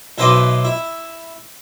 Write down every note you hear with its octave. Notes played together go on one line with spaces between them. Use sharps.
B1 E4 B4 C5 D#5 D6
E4